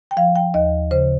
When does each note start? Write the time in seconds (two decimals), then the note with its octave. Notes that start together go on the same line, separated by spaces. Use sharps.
0.11 G5
0.17 F3 F5
0.36 G5
0.54 D#2 D#5
0.91 C#3 C5